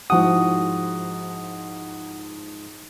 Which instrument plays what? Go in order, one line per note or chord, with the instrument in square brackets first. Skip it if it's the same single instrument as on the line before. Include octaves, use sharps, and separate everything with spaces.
[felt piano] G#2 F3 E4 [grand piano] F#4 F#5 [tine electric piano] D#6